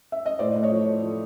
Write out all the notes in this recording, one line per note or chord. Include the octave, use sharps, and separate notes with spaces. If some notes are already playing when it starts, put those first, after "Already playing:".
E5
D#5
A2 C5 D5
A2
C#5 D#5
F3
A3
F3